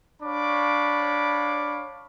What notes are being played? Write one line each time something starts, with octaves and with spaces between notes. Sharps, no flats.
D4 C#5 F5 B5 D6